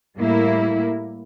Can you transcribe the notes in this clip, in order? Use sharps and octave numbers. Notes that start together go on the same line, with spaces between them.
A2 G3 A#3 E4